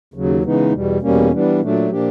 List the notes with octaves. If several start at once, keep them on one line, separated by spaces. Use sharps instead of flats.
D#2 C#3 F#3
C#3 E3 G#3 B3 D#4
E2 B2 G3
E2 B2 G3 A#3 C#4
E3 G3 B3 D4
A#2 F#3 A3 D4
A#2 F3 A#3 D4 G4